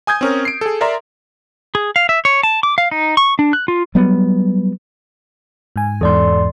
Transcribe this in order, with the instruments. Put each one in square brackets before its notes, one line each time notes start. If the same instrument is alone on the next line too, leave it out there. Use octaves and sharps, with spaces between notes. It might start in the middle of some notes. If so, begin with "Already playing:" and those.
[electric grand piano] G#5 D#6 G6 G#6
C4 C#4 A#4
C7 D7
G#4 A4
A#4 D5 E5 A#5 C6
[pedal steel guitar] G#4
F5
E5
C#5
A5
D6
F5
D#4
C#6
D4
F#6
F4
[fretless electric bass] F#3 G3 B3
[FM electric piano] G#2 G#5
[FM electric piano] E2 G#2 [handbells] A4 D5 C6